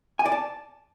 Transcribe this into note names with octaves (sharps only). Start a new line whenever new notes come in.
G#5
D5
A5